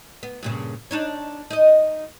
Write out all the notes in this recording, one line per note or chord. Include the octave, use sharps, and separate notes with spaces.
B3
G2 A#2 C#3
D4 D#4 C#5
D#4 D#5